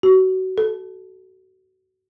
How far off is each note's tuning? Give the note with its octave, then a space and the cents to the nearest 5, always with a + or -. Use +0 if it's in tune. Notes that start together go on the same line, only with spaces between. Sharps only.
F#4 +25
A4 -15